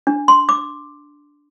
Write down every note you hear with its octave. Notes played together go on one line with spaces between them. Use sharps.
D4
C6
D6